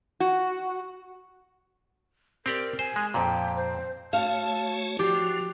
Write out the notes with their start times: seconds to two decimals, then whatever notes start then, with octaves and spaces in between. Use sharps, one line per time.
0.20 F#4
2.46 C4 G4 A#4 D5
2.79 C5 G#5
2.96 G#3
3.14 F2 A#2 G5
3.56 C5
4.13 A3 F#4 C#5 F5 A5
4.99 F3 F#4 G4